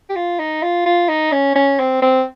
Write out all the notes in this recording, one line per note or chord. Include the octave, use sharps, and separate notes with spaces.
G4
F4
D#4
F4
F4
D#4
C#4
C#4
C4
C4